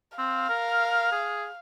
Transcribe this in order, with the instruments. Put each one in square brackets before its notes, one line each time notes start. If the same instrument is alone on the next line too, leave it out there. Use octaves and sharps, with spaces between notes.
[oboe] C4 [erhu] F5
[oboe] A#4
G#4